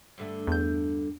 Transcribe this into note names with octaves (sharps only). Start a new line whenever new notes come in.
G2 D3 A3
E2 G6